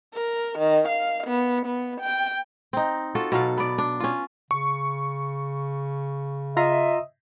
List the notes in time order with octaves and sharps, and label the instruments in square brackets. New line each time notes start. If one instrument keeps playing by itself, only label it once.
[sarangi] A#4
D#3
F5
B3
B3
G5
[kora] C4 D#4
F4 F#4 A4
B2 F#3 F5
B3 D5
D4
C#4 F4
[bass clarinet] C#3 [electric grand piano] C#6
[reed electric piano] F4 A#5 C6 [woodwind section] D#5 E5